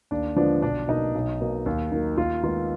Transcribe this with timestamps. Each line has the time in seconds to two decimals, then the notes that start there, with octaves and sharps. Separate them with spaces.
0.11 D#2 D4
0.36 D3 F3 G#3 B3 D4
0.62 B1 D4
0.88 B2 A#3 D#4
1.15 B1
1.41 B2 A#3
1.66 D#2
1.92 D#3 F#3 A#3
2.18 D#2 F4
2.44 D#3 G#3 B3 F4